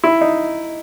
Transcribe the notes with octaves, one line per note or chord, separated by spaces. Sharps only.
E4
D#4